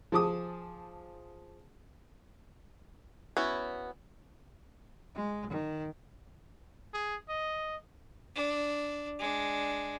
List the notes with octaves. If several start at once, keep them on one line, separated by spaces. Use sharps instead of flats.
F3 G#4 A5 D6 D#6
B3 C#4 E4 F#4
G#3
D#3
G#4
D#5
D4
G#3 D4